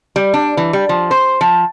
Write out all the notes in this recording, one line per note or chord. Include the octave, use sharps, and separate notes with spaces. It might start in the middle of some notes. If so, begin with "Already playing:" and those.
G3
D4
E3
G3
F3
C5
F3